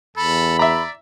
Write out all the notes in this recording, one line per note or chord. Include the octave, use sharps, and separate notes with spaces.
E2 A4 B5
D5 E5 A#5